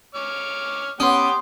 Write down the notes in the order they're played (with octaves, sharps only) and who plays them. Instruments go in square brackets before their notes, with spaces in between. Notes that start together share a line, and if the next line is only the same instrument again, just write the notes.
[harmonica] C#5 D6 F6
[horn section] B3 [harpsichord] C#4 [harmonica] G4 G5 [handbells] C6 D#6